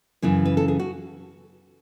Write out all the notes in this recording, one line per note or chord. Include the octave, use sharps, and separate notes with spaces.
F#2 C#3 E3 E4
B4
A4
G#4
F#4